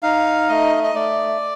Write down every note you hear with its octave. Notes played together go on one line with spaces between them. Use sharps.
D#4 F5
A3 D#5
D#5
A3 D5